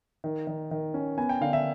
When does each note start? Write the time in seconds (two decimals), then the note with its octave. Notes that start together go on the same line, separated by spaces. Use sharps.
0.24 D#3
0.47 D#3
0.71 D#3
0.94 C#4
1.17 B3 G#5
1.29 G5
1.41 D3 F5
1.53 E5